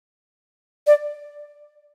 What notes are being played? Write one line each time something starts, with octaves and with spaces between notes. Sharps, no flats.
D5